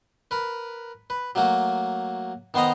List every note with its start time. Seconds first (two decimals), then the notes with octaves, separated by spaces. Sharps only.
0.31 A#4 B4
1.10 B4
1.35 F#3 A3 A#3 F#4
2.54 D#3 B3 C5 D#5 A#5